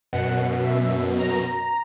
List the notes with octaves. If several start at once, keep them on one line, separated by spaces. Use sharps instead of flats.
F#2 B2 F#5
E5
A#5